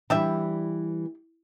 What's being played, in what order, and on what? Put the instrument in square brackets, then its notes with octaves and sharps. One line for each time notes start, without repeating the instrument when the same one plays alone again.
[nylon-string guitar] E3 G3 [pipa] D4 G4 E5